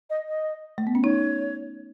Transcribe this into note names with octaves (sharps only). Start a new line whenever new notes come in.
D#5
D#5
A3
B3
C#4
D#4 C#5